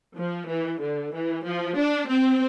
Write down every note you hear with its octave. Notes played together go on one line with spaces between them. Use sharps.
F3
E3
D3
E3
F3
D4
C4